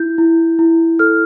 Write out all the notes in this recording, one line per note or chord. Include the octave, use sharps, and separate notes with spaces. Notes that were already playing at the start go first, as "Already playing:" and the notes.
Already playing: E4 G6
E4
E4
A4 F6